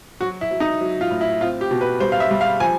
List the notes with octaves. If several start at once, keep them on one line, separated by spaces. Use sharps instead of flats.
F#3 F#4
E4
F#3
D#4
F#3
F4
A2
E4
C4 F4
G4
B2
B4
G3 C5
F5
E5
G3
F5
F3 G#5